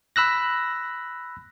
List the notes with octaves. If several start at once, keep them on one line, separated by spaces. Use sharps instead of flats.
B5 E6 F#6 A#6